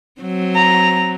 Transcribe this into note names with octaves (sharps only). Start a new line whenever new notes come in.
F#3 C4
A#5